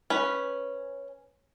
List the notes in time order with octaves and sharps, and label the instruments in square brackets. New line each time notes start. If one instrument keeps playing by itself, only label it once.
[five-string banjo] C#4 B4